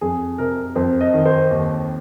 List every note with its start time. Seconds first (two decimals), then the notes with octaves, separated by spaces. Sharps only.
0.01 F2 G#4
0.38 C3 A#4
0.76 F2 C5
1.01 D#5
1.13 D#3
1.25 C5
1.51 D#2